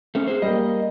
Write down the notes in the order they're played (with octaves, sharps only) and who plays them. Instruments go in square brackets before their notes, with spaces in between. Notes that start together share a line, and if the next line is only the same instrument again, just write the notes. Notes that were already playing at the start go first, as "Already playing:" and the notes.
[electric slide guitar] A3 C4 C#4
G#4 C5
[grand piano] G3 A#3 [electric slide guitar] D#5